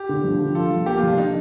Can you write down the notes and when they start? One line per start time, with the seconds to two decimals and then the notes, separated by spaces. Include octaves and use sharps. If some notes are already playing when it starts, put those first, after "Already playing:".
Already playing: G4
0.09 D3
0.24 F3
0.40 D3
0.55 F4 A4
0.71 F3
0.86 A#3 G4
0.98 F4
1.03 F3 D4
1.18 D4 D#4